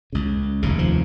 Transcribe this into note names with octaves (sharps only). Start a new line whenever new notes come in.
C#2 C#3
F1 D#2 C#3
F3